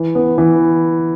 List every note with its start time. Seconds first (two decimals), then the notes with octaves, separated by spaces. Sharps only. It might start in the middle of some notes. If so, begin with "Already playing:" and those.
Already playing: E3
0.15 B3
0.38 E3